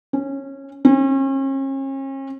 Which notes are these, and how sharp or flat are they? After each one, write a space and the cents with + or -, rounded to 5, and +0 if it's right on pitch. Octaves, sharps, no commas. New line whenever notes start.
C#4 -20
C#4 -40